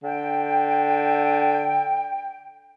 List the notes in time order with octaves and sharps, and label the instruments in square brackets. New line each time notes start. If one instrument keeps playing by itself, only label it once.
[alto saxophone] D3 [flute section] G5